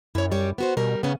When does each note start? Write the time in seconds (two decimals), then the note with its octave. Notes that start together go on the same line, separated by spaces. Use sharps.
0.15 F#2 E4 C#5
0.32 G3 C#5 D5
0.58 B3 F#4 C5
0.77 B2 G3 A#4
1.03 C#3 B3 C#4